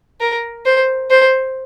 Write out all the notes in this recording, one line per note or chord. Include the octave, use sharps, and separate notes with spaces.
A#4
C5
C5